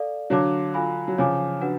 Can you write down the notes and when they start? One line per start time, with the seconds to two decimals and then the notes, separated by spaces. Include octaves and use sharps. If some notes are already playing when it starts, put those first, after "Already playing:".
Already playing: A4 D5 F5
0.30 D3 F#3 C#5 F5 A5 D6
0.74 F4 A4 F5 G#5 B5
1.08 F#3
1.18 C#3 F3 C#5 F5 G#5 D6
1.61 D4 F#4 B4 F#5